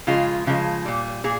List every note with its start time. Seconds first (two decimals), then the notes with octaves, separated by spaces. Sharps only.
0.07 C#3 F3 G#3 F4
0.46 C#3 F3 G#3
0.85 A#2 G3
1.24 A#2 G#4